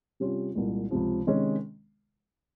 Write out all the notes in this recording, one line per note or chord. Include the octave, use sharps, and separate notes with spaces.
C3 G3 C#4 F4
C2 A#2 G#3
C#2 C3 F3
C3 D#3 G#3 C#4